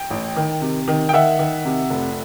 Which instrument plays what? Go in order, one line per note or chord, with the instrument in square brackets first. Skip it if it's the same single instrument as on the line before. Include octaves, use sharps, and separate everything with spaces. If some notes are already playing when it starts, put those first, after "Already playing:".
Already playing: [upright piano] G5
A1
D#3
C3
D#3
G5
D#3 E5 F#5
D#3
C3
F1